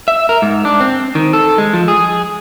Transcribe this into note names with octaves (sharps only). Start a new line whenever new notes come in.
E5
A#4
G#2
D4
C4
D#3
A4
G#3
F3
G#4